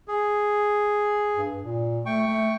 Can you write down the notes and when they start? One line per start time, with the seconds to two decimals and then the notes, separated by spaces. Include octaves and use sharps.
0.08 G#4
1.36 G2
1.63 A#2
2.06 A3 G5 C#6
2.27 A3